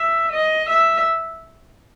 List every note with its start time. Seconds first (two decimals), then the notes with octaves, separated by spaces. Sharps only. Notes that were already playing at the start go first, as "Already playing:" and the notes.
Already playing: E5
0.32 D#5
0.69 E5